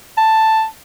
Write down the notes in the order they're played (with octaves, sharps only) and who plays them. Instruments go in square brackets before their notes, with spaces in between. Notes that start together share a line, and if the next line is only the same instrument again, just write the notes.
[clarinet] A5